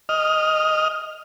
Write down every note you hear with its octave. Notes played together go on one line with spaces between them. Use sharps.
D#5 F6